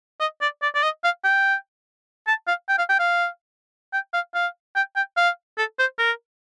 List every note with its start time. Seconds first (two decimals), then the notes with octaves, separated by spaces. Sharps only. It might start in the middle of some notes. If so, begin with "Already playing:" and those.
0.20 D#5
0.41 D5
0.62 D5
0.75 D5
0.83 D#5
1.04 F5
1.24 G5
2.27 A5
2.48 F5
2.69 G5
2.78 F5
2.89 G5
2.99 F5
3.93 G5
4.14 F5
4.34 F5
4.76 G5
4.96 G5
5.17 F5
5.58 A4
5.79 C5
5.98 A#4